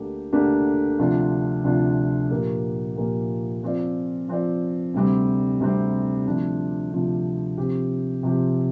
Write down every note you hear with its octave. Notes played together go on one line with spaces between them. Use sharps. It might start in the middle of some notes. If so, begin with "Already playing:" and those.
Already playing: D2 D3 A#3 D4 G4
D2 D3 A#3 D4 G4
D2 C3 F3 D4 F4
D2 C3 F3 D4 F4
A#2 F3 A#3 G4 A#4
A#2 F3 A#3 G4 A#4
F3 C4 F4 D5
F3 C4 F4 D5
D2 C3 G3 C4
D2 C3 G3 C4
D2 C3 F3 D4 F4
D2 C3 F3 D4 F4
C3 F3 C4 G4
C3 F3 C4 G4